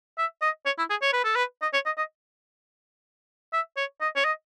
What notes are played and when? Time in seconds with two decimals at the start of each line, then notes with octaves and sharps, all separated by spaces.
0.18 E5
0.42 D#5
0.66 C#5
0.78 E4
0.90 G#4
1.02 C#5
1.13 B4
1.24 A4
1.36 B4
1.62 D#5
1.74 C#5
1.86 D#5
1.98 D#5
3.53 E5
3.77 C#5
4.01 D#5
4.16 C#5
4.25 D#5